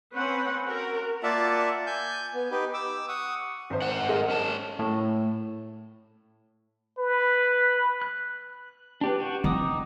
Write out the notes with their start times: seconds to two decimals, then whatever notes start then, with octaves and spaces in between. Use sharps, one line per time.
0.13 C4 C#4 B4 F#5
0.65 F#4 A#4
1.23 A#3 F4 D5 E5 F#5 A5
1.87 G#5 G6
2.34 B3
2.51 D#4 G4 B4
2.74 D6 E6
3.09 F#5 C#6 D#6
3.70 G#1 C5
3.82 G#2 F#5
4.09 G#4 A#4 D#5
4.30 C#4 A5
4.79 A2
6.98 B4
8.02 F#6
9.01 D4 G4 B4
9.20 F#4 G5
9.44 C4 D#4 D6 D#6